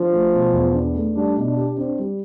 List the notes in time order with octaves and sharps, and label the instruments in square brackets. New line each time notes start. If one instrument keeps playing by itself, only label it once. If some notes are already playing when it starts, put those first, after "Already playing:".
Already playing: [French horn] F3 [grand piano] D4
[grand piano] A3
B2
E2
D4
A3
[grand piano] G3 [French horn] D4
[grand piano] B2
[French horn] D4
[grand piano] G4
[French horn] C4 [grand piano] D4
[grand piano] G3